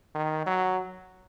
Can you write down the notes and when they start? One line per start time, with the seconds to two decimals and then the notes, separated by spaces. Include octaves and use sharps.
0.15 D#3
0.46 F#3